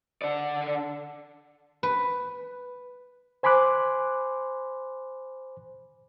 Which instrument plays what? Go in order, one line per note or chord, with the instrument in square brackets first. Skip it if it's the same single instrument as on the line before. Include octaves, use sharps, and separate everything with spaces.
[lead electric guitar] D3 D5
[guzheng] B4
[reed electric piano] C5 G#5 B5 C6 D6 F#6